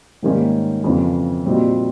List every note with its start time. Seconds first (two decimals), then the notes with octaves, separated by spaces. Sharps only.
0.22 G#2 D#3 G3 A#3 C#4
0.84 F2 C#3 E3
1.46 A#2 G3 C4 D#4 F#4